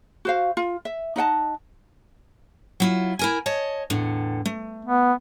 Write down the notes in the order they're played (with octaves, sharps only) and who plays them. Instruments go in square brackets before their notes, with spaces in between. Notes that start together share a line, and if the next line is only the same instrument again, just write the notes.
[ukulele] F#4 C5 F5
F4
E5
D#4 D#5 F#5 A5
[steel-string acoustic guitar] F#3 E4 F4
E4 A#4 G#5
C#5 D#5 A5
E2 A2 D3
A3
[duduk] B3